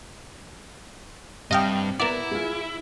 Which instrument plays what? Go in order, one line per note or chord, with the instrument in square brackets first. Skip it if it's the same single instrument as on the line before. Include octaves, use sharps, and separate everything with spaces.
[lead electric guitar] G2 [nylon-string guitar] C3 [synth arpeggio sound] D#5 F5 G5
[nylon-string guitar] B3 F#5 [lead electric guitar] E4 [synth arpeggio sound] A#4 D5
[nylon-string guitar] F4 G#4